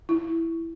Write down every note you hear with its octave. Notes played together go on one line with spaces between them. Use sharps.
E4